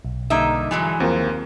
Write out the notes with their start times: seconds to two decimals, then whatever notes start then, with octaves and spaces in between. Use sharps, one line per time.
0.05 B1
0.30 G2 D3 A#3 D#4 E5
0.71 E3 F#3 G#3
1.00 D#2 F3 C4 F4 A#4